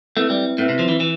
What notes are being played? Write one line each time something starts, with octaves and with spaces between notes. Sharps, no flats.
A3 C4 E4 B4 E5
G3
A2 C4 E4 B4 E5
C3
F3
E3
E3 E4